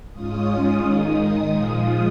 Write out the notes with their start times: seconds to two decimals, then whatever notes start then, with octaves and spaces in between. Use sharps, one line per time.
0.12 G#2 G#3 C#4 F4 D#6
0.82 D#3 G#3 D#4 D#6
1.54 A#2 F3 G#3 F4